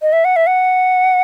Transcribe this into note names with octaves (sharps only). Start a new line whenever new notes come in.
D#5
E5
F#5
E5
F#5